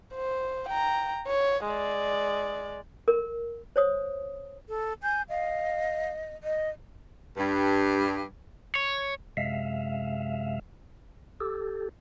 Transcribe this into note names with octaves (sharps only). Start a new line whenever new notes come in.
C5
G5 A#5
C#5
G#3 D5
A#4
C5 C#5 D#6
A4
G#5 G6
D#5 F5
D#5
G2
C#5
F#2 C3 G#3 E5 F5
G4 A4